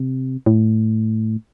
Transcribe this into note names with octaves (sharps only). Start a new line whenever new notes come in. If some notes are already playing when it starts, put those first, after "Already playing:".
Already playing: C3
A2